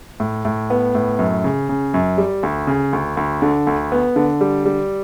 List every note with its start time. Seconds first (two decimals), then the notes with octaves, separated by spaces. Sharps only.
0.20 A2
0.45 A2
0.70 B3
0.95 A2
1.19 F#2
1.44 C#3
1.69 C#3
1.94 F#2
2.18 G3
2.43 D2
2.67 C#3
2.93 D2
3.17 D2
3.42 D3
3.67 D2
3.92 B3
4.16 D3
4.41 G3
4.65 G3